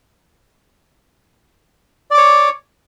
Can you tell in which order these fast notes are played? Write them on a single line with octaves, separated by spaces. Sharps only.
D5 D6 C#5